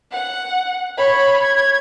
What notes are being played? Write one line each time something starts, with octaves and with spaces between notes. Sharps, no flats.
F#5
C#5 B5
G#6